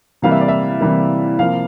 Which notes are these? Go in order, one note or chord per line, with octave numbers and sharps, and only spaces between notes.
C3 E3 G3 A#3 F5
E5
D5
E5
C3 E3 G3 A#3
C3 F3 A#3 F5